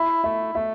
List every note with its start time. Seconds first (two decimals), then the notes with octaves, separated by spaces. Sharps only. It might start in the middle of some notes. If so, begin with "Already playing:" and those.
Already playing: E4 E5
0.24 A3 E5
0.55 A3 E5